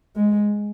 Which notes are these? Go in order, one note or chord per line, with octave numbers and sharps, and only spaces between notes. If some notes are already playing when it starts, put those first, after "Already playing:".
G#3